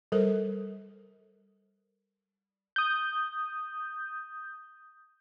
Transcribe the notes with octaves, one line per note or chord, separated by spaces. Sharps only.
G3 A4 A#4 C5
D#6 G6